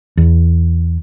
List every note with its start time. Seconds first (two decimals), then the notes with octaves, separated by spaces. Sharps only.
0.17 E2